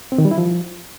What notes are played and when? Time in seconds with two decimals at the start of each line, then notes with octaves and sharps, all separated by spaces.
0.12 C4
0.18 D#3
0.25 G3
0.31 E4
0.38 F3